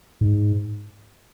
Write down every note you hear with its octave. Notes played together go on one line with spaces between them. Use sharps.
G#2